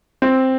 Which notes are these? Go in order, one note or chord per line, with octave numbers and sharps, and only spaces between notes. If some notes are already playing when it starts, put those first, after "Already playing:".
C4